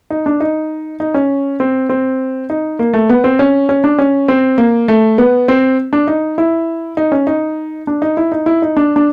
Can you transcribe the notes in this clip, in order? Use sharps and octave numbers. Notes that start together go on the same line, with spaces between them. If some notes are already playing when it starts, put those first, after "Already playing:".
D#4
D4
D#4
D#4
C#4
C4
C4
D#4
A#3
A3
B3
C4
C#4
C#4
D4
C#4
C4
A#3
A3
B3
C4
D4
D#4
E4
D#4
C#4
D#4
D4
D#4
E4
D#4
E4
D#4
D4
D4